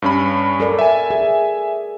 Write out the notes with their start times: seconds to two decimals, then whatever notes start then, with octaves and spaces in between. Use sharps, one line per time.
0.02 G2 C#4 B5
0.60 A4 A#4 D5
0.79 E5 G#5
1.10 G#4